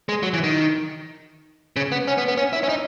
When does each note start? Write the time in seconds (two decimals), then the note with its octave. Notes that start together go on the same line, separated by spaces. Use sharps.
0.09 G#3
0.23 F#3
0.34 E3
0.44 D#3
1.76 C#3
1.92 B3
2.07 C#4
2.18 B3
2.28 B3
2.37 C#4
2.53 E4
2.63 C#4
2.69 D#4